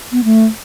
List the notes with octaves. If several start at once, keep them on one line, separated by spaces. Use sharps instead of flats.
B3
A3